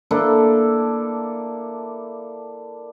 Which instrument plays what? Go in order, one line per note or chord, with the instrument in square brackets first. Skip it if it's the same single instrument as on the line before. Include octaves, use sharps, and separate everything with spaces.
[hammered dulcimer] A#3 D4 E4 A4